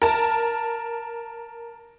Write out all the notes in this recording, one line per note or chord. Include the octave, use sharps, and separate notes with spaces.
A#4 A5